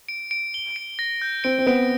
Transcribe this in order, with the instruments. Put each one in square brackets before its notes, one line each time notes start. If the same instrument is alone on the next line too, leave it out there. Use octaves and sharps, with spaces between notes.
[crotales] D7
D7
G7
D7
A#6
G6
[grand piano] C4 [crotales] D7
[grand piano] C4
[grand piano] B3 [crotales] D7